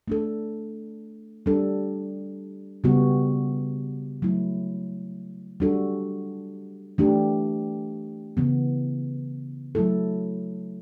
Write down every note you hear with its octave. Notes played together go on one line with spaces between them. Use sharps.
A3 D4 A4
G3 D4 A4
C#3 G3 B3 F#4
F#3 A3 E4
G3 D4 F#4 A4
E3 A3 D4 G4
C#3 E3 B3
F#3 A3 E4 A4